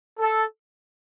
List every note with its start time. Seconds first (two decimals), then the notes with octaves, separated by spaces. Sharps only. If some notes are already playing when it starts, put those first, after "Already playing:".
0.20 A4